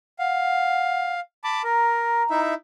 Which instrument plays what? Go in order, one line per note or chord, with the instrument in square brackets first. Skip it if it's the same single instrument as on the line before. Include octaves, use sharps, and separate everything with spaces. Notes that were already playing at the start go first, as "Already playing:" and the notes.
[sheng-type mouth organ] F5 [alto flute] F#5
[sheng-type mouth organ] A5 B5 D6
[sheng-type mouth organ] A#4 [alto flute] A#5
[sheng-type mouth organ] D#4 E4 E5